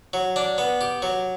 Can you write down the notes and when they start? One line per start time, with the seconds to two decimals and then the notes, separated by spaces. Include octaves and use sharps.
0.13 F#3
0.36 D4
0.58 B3
0.81 G4
1.02 F#3